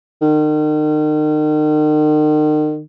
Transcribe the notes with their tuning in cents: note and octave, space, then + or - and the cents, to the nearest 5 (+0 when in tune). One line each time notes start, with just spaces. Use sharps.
D#3 -35